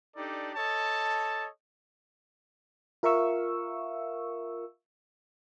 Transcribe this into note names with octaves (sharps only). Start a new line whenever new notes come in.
D4 D#4 G4 A4 D5
A4 C#5 D#5 A5
F4 A#4 E5 F5 C#6 E6